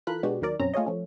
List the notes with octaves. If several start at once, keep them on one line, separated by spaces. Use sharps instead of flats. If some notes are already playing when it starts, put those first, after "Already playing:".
E3 F4 A4 A#4 B5 F#6
B2 G#3 B3 D4 F#4 G4
D#2 D#3 F#3 A#4 D5
B1 F#2 C4 C#4 A#5
A3 F4 G#4 C#5 D#5
F3 A3 C#4